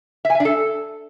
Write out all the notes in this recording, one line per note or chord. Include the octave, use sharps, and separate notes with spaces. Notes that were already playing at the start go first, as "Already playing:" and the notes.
E5
G#5
E5
D4
A4